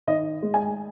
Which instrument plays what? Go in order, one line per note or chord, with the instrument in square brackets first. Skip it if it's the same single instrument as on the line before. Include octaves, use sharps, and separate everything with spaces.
[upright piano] D#3 D#5
G#3
G#5